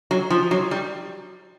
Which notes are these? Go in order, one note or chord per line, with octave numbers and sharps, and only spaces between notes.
F#3
F3
F#3
G3